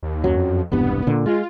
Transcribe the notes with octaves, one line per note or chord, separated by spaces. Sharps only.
D#2
F#2 F#3
F2
E1 C2 G2 B3
A#2 D3
G#3 F4